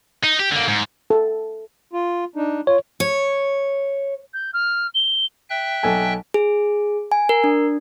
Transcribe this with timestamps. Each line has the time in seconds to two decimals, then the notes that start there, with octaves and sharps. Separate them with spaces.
0.24 D#4
0.39 G4
0.51 D3 A#3
0.68 G#2
1.10 A4
1.93 F4
2.36 D4 D#4
2.67 F4 C#5
3.00 C#5
4.33 G6
4.53 F6
4.94 G7
5.50 E5 G5 F#6
5.83 B1 A4 G#5
6.34 G#4
7.12 G#5
7.29 A#4
7.44 D4